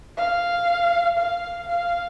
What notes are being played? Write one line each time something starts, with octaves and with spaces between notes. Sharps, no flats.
F5
F5
F5